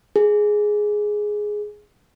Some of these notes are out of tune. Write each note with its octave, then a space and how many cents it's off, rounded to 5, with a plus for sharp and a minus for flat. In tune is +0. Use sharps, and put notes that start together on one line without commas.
G#4 +5